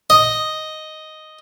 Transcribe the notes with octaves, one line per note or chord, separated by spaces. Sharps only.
D#5